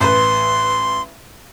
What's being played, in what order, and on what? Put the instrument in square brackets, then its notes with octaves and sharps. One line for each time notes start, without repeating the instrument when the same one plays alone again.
[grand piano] A1 B4 [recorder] C6